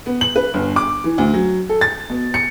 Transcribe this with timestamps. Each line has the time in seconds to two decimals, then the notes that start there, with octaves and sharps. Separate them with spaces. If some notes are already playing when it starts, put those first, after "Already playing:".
0.06 B3
0.21 F#7
0.36 B4
0.54 G1
0.76 D6
1.04 E3
1.18 D2
1.34 F#3
1.69 A4
1.81 A6
2.10 B2
2.34 C#7